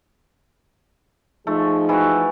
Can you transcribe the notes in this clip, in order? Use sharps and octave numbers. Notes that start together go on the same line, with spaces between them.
F3 A3 D#4 G#4
E3 F#4